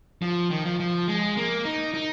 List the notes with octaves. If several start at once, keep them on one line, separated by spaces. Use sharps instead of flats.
F3
D#3
F3
F3
G#3
A#3
D#4
D#4